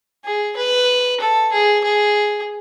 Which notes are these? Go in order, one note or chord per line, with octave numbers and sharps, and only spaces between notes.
G#4
B4
A4
G#4
G#4